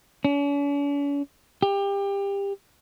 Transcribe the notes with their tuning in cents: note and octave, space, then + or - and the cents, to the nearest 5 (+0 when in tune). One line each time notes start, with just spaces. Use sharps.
C#4 +45
G4 +25